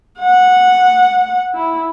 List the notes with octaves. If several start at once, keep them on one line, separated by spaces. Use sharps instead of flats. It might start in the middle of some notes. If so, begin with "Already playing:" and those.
F#5
E4